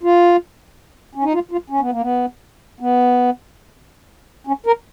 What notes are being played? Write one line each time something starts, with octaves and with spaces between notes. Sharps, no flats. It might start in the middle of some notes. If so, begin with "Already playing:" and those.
F4
C#4
D#4
F4
F4
C#4
B3
A#3
B3
B3
C#4
A#4